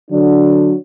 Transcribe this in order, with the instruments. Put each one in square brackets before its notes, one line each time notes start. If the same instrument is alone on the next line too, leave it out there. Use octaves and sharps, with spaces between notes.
[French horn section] D3 F#3 D4